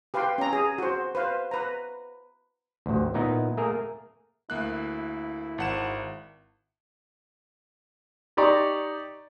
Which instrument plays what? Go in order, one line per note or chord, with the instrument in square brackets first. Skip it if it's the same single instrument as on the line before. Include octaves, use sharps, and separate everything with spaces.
[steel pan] G4 B4 F5 G5 C6
C#4 A#5
G#4
F#4 C5
B4 C5 F5
B4 A#5
[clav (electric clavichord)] A1 D2
A#2 B3 D#4 E4
A3 A#3 G#4 A#4
[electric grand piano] D2 A#3 F#6 [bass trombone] E4
[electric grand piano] G#1 F#5 E7
[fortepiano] D#4 G4 D5 A#5 C#6